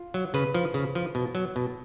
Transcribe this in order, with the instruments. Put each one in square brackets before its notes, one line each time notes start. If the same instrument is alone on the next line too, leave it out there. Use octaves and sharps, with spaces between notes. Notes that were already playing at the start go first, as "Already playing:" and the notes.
Already playing: [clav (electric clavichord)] F4
F#3
C#3 B4
F3
C#3
F3
B2
F#3
B2